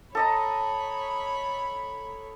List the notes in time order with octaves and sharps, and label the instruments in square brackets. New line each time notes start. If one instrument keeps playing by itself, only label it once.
[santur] A4 D#5 A#5 [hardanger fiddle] C#5 B5